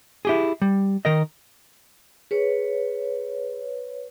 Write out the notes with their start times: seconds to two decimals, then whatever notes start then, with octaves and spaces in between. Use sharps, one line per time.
0.25 E4 G4 G#4
0.62 G3
1.05 D#3 A#4 D#5
2.31 G#4 B4 C#5